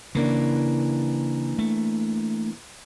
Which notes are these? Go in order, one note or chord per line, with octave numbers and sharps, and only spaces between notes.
C#3 E3 A#3 D4
A3